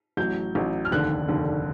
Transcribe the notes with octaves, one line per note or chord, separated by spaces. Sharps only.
A1 A2 F#3 G6
A1 A2 F#3
F6
F1 D#2 D3 F#6
F1 D#2 D3